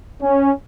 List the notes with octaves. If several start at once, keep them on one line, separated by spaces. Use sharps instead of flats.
C#4